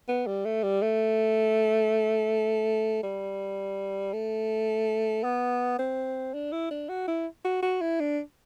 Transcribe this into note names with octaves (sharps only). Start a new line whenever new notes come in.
B3
G3
A3
G3
A3
G3
A3
B3
C4
D4
E4
D4
F#4
E4
F#4
F#4
E4
D4